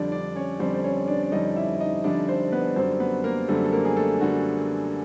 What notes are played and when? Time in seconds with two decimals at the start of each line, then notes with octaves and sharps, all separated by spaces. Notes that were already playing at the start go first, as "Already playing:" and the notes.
Already playing: F2 D3 G3 D4 D5
0.11 D4 D5
0.35 C#4 C#5
0.59 F2 D3 G3 C4 C5
0.74 C5
0.84 C#4 C#5
1.08 D4 D5
1.23 D5
1.32 F2 D3 G3 D#4 D#5
1.56 E4 E5
1.80 D#4 D#5
2.04 F2 D3 G3 D4 D5
2.28 C4 C5
2.52 B3 B4
2.76 F#2 D3 G3 C4 C5
3.00 B3 B4
3.24 A#3 A#4
3.48 F#2 D3 G3 A3 A4
3.64 A4
3.72 A#3 A#4
3.85 G#4
3.96 A3 A4
4.21 D3 G3 F#4